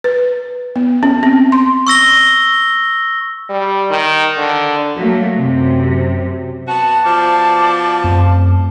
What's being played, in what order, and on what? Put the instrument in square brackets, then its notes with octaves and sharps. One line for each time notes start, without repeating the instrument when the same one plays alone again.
[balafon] B4
B3
C#4
C4
C6
[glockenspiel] C#6 E6 A#6 G7
[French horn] G3
D#3
D3
[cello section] F#3 A3 A#3
F#2 C3
[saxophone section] B3 F#4 [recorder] A5
[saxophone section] B2 F3 [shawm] D5
[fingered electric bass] F#2 A3 C4